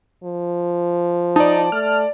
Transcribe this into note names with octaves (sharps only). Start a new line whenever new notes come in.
F3
D#4 D5 A5
A3 F6